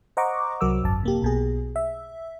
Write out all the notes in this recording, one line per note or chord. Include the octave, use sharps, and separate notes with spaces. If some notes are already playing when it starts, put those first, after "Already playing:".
C5 D#5 F#5 A#5 C#6 D6
C2 F#3 A#4 D6 E6
G#1 F#2 A5
C3 A#3 G4
B1 B2 G#4
E5